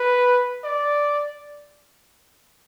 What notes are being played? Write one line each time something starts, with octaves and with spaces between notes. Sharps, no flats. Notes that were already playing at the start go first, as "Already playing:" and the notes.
Already playing: B4
D5